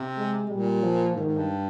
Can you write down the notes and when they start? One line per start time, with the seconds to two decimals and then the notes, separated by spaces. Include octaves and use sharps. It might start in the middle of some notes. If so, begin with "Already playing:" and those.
Already playing: C3
0.17 G#3
0.50 A#2 G3
0.83 F3
1.16 G#2 D#3
1.26 G#2
1.37 G2